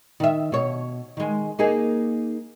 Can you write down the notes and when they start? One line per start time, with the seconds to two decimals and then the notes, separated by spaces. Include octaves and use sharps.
0.20 D#3 E5
0.52 B2 C#5
1.17 D#3 G#3
1.59 A#3 D#4 G#4